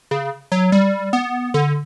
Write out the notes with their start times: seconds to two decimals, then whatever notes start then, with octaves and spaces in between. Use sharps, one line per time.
0.11 C#3
0.52 F#3
0.72 G3
1.13 B3
1.54 D3